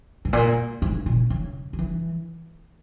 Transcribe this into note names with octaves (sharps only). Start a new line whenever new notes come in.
G#2
A#2
G#2
A#2
C#3
F#3
E3